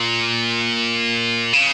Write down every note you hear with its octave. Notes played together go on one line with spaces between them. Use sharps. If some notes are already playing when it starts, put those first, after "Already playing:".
Already playing: A#2
C#3